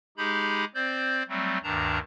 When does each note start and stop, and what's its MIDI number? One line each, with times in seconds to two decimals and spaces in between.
0.17 0.65 56
0.17 0.65 63
0.17 0.65 67
0.17 0.65 68
0.17 0.65 83
0.17 0.65 91
0.75 1.23 60
0.75 1.23 72
0.75 1.23 74
0.75 1.23 91
1.29 1.58 54
1.29 1.58 55
1.29 1.58 57
1.29 1.58 60
1.63 1.99 38
1.63 1.99 43
1.63 1.99 51
1.63 1.99 62
1.63 1.99 81
1.63 1.99 82